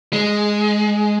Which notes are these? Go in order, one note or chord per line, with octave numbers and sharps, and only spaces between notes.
G#3